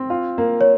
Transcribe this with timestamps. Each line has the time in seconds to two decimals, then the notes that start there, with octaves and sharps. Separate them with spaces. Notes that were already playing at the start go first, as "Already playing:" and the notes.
Already playing: C4
0.10 F4
0.38 A#3
0.61 C#5